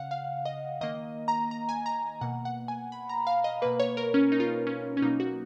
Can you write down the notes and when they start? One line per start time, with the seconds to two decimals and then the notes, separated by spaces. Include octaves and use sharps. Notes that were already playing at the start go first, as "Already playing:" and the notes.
Already playing: C#3 F5 F#5
0.11 F5
0.45 D#5
0.81 D#3 A#3 D#5
1.28 A#5
1.51 A#5
1.69 G#5
1.86 A#5
2.21 B2 A#3 F#5
2.45 F#5
2.68 G#5
2.92 B5
3.09 A#5
3.27 F5
3.44 D#5
3.62 B2 A#3 B4
3.80 C#5
3.97 A#4
4.14 C#4
4.32 D#4
4.40 F4
4.48 D#4
4.67 C#4
4.97 C#4
5.02 B2 F#3 A#3 D#4
5.20 F#4